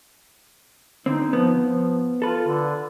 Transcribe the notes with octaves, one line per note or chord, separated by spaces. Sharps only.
D3 C4 D#4
F3 B3
F3
F4 A4 B4
D3